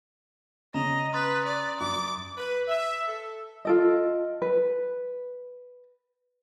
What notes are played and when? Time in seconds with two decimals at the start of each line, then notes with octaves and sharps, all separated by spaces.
0.74 C#3 C#4 D#5 A#5 F7
1.13 B4 C6 D#6 A6
1.45 D5
1.80 F#2 D6
2.37 B4
2.68 E5
3.06 A4
3.65 F4 A4 D#5
4.42 B4